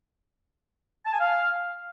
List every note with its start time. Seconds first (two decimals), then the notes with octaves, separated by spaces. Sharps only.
1.05 A5
1.13 G#5
1.20 F5